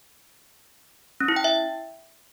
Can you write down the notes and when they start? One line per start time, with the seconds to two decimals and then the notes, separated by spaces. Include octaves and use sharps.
1.21 C#4
1.28 E4
1.36 G5
1.44 E5